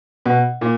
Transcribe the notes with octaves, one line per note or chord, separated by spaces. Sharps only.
B2
A#2